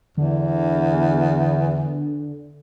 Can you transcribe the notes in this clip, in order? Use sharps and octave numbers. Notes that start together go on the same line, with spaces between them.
E2 D3